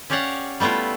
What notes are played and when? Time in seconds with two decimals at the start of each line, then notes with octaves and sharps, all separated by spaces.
0.10 C#4 G4 C#5 D5 F5 F#5
0.60 G3 A3 B3 E4 F4